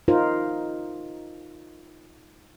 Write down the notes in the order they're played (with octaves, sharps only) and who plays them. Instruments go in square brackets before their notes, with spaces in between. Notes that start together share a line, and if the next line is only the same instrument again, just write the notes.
[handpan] D#4 F4 A#4 C5